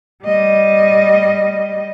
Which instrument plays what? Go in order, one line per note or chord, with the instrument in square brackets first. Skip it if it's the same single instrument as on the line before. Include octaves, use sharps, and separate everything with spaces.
[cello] G3 D#5